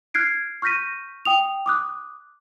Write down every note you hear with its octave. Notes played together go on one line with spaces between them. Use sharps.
F6 F#6 G#6 C7 D7
C#6 F6 G6 A#6 B6 D#7
G5 D#6 F7
D6 D#6 F#6